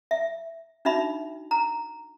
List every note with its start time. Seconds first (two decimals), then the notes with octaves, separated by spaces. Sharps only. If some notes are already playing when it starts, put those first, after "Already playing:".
0.11 E5
0.85 D4 D#4 F#4 E5 B5
1.51 A#5